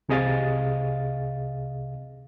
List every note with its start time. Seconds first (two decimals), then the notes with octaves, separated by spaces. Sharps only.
0.09 C2 C3 G#4 D#5 F5 A6